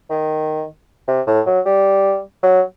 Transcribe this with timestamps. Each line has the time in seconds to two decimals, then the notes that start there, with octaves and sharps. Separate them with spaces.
0.10 D#3
1.08 C3
1.27 A2
1.46 F#3
1.66 G3
2.43 F#3